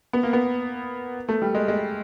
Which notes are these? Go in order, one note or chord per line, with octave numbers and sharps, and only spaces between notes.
B3
A#3
B3
A3
G3
G#3
G#3